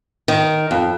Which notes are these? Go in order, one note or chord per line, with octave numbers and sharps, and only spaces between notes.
D#3
F2